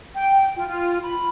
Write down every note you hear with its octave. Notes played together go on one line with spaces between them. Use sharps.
G5
F4
F4
B5